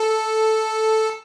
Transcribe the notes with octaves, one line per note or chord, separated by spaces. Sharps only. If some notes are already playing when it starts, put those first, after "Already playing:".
Already playing: A4